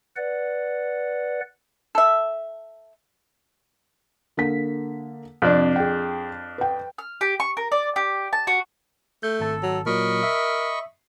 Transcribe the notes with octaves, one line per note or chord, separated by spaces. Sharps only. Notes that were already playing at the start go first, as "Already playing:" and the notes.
B4 D5 F#5
A4 E5
D3 A#3 B6
F2 C3 D4
G#4 G5
B4 G5
F6
G4
C#6
A#4
D5
G4
A5
F#4
A3 G6
G#1 A4 A5
F#3
A#2 F#3 A#4 D#5 B5 C#6
E5